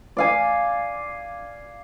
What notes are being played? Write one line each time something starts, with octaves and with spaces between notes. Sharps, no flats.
D5 F5 G#5